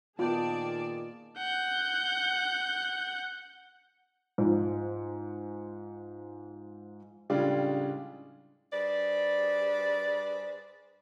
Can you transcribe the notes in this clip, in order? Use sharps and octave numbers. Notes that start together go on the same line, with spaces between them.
A#2 D#3 B3 F4 G#4 D5 G5 A5
F#5 G6
G#2 F3
A2 C#3 G3 G#3 D4 F4
G2 G#4 B4 C5 D5